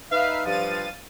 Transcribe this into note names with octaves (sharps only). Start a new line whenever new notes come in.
D#4 B4 E5 F5
G2 F3 F5 A6 D#7